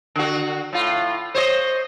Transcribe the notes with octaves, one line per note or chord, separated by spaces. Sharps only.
D3 F#4
A2 F4
C5 C#5 D#5